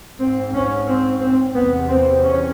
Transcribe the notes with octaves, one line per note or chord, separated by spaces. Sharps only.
G#2 C4
C#4
C4
C4
E2 C3 B3
C4
C#4